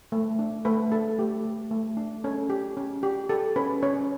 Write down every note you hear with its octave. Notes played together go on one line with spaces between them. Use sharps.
A3
D4
A3 B4
D4 A4
A3 G4
A3
A3
D4
C#4 A4
G4
C#4
G4
G4 A4
C#4 B4
C#4 C#5